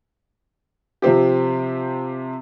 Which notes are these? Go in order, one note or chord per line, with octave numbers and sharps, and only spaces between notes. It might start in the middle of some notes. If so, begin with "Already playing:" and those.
C3 F3 C4 G4